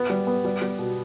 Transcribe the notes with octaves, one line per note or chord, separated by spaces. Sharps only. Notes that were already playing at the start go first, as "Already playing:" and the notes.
Already playing: B3
G3
B3
G3
G3
B2